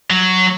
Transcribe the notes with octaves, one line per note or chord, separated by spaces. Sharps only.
F#3